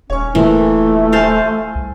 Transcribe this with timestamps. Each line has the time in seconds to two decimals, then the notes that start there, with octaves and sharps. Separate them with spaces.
0.10 D#1 C#4 C#5 C#6
0.35 A#2 E3 A3 A#4
1.13 C5 F5 G#5 A6
1.75 C2